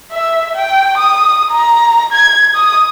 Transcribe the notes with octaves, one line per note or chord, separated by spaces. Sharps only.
E5
G5
D#6
A#5
G#6
D#6